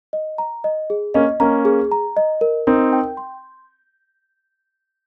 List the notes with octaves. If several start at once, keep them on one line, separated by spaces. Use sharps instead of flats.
D#5
A#5
D#5
G#4
A#3 C#4 D#5
A#3 C#4 A#5
G#4
A#5
D#5
A#4
C4 D#4 A#4
G5
C6